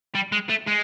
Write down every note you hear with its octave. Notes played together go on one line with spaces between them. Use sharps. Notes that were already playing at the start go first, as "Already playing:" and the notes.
G3
G#3
A3
G#3